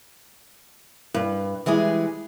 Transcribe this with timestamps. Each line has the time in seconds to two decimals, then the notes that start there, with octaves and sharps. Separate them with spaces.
1.14 G2
1.66 E3 G3 G#3 G#4